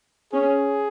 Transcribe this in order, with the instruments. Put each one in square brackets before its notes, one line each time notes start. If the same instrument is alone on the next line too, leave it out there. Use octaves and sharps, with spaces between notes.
[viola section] C#4 [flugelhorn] G#4